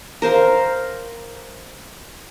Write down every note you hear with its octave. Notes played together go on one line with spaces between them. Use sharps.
A#4 C5 F5